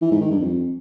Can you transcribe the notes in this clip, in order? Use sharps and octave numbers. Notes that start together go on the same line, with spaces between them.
E3
G#2
D#3
G2
F2